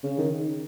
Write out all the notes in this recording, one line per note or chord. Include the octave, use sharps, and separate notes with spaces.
C#3
D#3